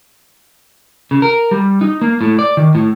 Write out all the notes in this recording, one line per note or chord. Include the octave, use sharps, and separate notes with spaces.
C#3
A#4
G3
D#4
A#3
A2
D5
D#3
A2